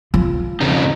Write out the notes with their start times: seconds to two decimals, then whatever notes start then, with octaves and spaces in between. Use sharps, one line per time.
0.14 F3
0.61 F2 C#3 D#4